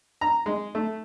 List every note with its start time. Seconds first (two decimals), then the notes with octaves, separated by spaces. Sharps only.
0.21 A#5
0.46 G#3
0.75 A3